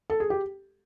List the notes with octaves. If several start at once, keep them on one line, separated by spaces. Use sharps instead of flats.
A4
G#4
G4